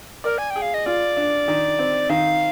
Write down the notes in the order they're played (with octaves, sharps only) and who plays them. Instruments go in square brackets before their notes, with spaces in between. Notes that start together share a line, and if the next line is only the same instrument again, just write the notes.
[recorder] A#4 [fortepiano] D5
[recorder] G#5
G5
[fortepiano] G#4
[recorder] F5
D#5
[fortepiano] F4 [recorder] D5
[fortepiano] D4
D#3
C4
[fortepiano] D#3 [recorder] F5